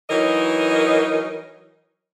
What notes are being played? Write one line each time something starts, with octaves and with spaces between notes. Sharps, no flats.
E3 F#3 D#4 A#4 D#5